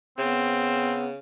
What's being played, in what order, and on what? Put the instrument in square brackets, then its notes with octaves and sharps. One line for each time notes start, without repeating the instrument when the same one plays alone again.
[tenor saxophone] C#3 [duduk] B3 [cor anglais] C4